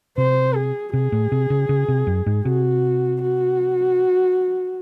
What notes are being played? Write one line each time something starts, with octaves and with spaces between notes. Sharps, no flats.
C3 C5
G#4
C3 G#4
A2
C3
C#3
C#3
C3
F#2
G#2
C3 F#4
F#4